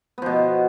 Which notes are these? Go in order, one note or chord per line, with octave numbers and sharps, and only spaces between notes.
B2 F3 B3